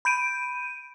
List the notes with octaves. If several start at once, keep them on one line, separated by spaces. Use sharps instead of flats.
B5 G6 D7 D#7